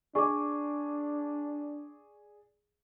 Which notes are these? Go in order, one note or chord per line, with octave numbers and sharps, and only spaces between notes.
D4 G#4 D5 C#6 D6